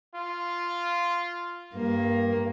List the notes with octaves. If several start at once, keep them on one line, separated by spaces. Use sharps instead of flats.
F4
G2 A#3